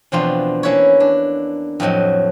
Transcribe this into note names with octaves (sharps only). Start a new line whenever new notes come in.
E2 B2 F3 C4 D4 F4
A#3 C#4 E4 B4 C#5
D4
F2 A2 F3 F#3 D#5